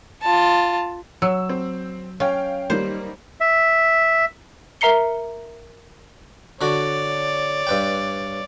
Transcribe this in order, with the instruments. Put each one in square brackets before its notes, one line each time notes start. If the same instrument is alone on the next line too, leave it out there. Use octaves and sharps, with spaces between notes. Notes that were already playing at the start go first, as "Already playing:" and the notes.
[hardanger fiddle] F4 A5
[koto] F#3 [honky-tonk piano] E6
[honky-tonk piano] C4
[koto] C#4 [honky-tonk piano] F5 G5
[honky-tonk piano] D#3 G3 A#3 [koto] C5
[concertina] E5
[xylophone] A#4 E5 A#5 C7 C#7 G7
[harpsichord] D3 F#4 [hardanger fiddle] C#5 D5
[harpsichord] G2 B4 G5